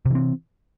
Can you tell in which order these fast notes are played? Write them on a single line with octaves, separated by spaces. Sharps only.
C3 E3 C4